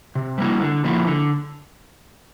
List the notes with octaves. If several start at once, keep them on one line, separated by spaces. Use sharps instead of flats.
C3
G3 A#3 E4
D3
F3 A#3 E4
D3